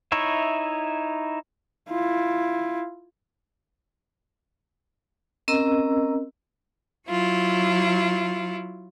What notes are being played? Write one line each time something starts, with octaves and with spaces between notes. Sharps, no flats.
D#4 E4 C#5 E5
E4 F4
C4 C#4 A#4 D#5 A#5 E6
F#3 E4 F4